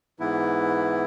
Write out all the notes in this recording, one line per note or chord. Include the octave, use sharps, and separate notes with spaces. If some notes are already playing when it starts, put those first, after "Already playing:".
G#2 E3 B3 E4